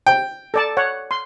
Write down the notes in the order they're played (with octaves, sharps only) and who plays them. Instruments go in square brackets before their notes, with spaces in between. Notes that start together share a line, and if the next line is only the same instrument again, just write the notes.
[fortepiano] G5
[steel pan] A4 D5 A5
C#5 F#5
C6